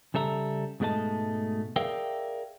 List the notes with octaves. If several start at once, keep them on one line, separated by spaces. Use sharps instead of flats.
C#3 G3 A4 E5 A#5
G#2 B2 G#3 A3 D#5 A5
G#4 A#4 D5 E5 F5 G5